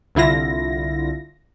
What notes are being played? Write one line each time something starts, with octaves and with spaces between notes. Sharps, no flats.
C2 D3 E4 F4 A#6